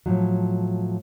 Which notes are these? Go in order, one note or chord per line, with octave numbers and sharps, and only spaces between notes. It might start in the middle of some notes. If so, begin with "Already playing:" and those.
A2 F3 F#3